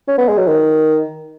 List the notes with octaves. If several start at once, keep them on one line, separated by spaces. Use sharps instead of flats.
C#4
B3
G#3
F#3
D#3